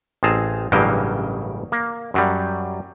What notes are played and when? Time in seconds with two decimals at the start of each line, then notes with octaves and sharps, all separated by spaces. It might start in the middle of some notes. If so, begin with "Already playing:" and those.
0.23 A1 C4 G#4 A5 A#5
0.72 A1 G2 C#3 F#3 A#3 G5
1.72 A#3
2.14 F#2 F#3 G3